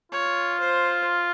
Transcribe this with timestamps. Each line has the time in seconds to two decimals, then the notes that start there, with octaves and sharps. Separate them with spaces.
0.12 F4 C#5
0.60 C5